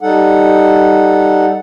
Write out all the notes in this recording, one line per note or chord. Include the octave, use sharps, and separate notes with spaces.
G3 D#4 A4 F#5